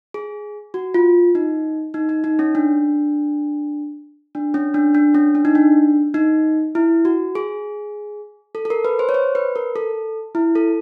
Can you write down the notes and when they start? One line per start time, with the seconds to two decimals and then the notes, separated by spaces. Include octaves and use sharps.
0.14 G#4
0.74 F#4
0.94 F4
1.35 D#4
1.94 D#4
2.09 D#4
2.24 D#4
2.39 C#4
2.55 D4
4.35 D4
4.54 C#4
4.74 D4
4.95 D4
5.15 C#4
5.35 D4
5.45 D#4
5.55 D4
6.14 D#4
6.75 E4
7.05 F#4
7.35 G#4
8.55 A4
8.65 A4
8.70 A#4
8.85 B4
8.99 C5
9.09 C#5
9.14 C5
9.35 B4
9.56 A#4
9.76 A4
10.35 E4
10.55 A4